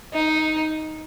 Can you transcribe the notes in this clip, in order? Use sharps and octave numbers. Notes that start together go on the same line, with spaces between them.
D#4